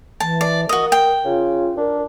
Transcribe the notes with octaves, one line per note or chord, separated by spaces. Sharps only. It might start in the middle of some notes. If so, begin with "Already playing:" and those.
E3 A5
D5
F#4 A#4 D#5
G5
C#3 F4
D4 A#4